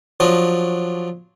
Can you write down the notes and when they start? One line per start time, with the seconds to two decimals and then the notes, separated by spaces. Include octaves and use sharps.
0.20 F3 F#3 D4 C#5 D#5